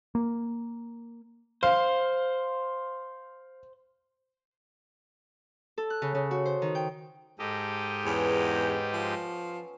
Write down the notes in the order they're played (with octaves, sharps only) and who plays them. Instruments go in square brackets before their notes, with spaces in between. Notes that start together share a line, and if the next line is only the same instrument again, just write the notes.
[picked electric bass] A#3
[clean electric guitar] C5 [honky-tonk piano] F5
[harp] A4
F#6
C#3
C#3
F#4
C5
D#3
G5
[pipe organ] G#2 G4 D#5 [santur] A4
[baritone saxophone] E2 [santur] B3 C#4 C#5
[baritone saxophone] F3